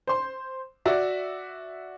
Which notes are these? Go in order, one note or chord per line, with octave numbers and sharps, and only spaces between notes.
C5 C6
F#4 D5 E5